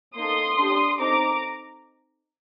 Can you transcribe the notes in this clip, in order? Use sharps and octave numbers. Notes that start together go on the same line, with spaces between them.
A#3 D#4 A4 C6 D#6
D4 G4
C4 D#4 A4 A#5 D6